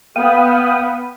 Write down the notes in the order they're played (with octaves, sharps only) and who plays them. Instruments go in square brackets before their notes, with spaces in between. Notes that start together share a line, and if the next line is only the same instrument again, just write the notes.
[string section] B3 B4 [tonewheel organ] F5 G5 D#6